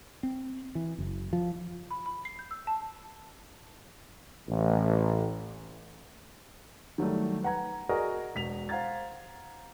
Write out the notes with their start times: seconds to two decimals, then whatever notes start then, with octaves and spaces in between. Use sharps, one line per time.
0.23 C4
0.75 E3
0.98 F#1
1.33 F3
1.91 B5
2.06 B5
2.25 C7
2.39 G6
2.51 E6
2.67 A5
4.49 A1
6.98 D#3 F#3 G3 A3
7.43 B4 F#5 A#5 G#6
7.89 F#4 G#4 A#4 D5 D#5
8.35 E1 B6 F7
8.69 C5 F5 F#5 A#5 G#6 A6